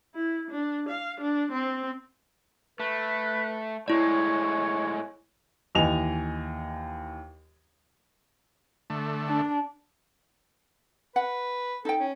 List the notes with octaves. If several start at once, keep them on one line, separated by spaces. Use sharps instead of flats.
E4
D4
F5
D4
C4
A3 B4
A2 G#3 E4 C#5 D5
D#2 E3 D#5 G#5 F7
D3 A3
D4
B4 F#5
D#4 A4 G5
C#4